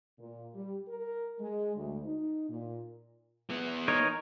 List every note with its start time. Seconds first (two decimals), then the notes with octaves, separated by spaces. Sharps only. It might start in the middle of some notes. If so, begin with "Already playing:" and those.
0.19 A#2
0.53 G3
0.88 A#4
1.39 G#3
1.76 D2
2.05 D#4
2.49 A#2
3.50 E3 B3
3.88 D#4 A#4 C#5